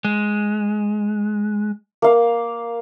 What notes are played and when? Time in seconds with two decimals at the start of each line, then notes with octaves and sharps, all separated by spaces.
0.05 G#3
2.02 A#3 F5